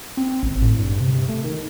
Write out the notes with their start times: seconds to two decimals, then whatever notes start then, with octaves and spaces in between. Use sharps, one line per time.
0.17 C4
0.43 G#1
0.62 A2
0.79 G2
1.00 C3
1.15 C3
1.29 A3
1.44 D#3